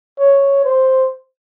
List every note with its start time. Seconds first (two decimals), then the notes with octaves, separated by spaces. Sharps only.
0.19 C#5
0.64 C5